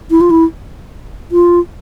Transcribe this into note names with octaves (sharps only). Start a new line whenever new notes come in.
E4
F4
E4
F4